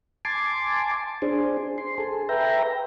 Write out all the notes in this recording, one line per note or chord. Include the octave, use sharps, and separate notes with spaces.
G#5 A5 C6 D6
D4 G#4 C5
C6
G#4 A4
B4 E5 G5 A#5